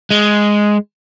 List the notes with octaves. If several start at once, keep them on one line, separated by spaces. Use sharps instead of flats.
G#3